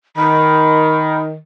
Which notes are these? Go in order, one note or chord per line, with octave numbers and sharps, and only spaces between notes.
D#3 B5